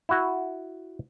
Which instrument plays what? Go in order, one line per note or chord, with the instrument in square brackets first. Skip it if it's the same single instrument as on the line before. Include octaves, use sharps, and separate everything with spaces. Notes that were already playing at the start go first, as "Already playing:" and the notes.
[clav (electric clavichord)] E4 F#4